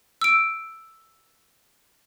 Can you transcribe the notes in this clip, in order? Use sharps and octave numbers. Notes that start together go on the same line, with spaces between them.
E6 D7